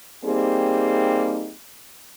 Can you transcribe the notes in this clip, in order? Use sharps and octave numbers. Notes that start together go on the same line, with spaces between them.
G3 A#3 C4 D#4 G4 G#4